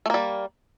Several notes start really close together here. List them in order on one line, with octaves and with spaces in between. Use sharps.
A3 A#3 G3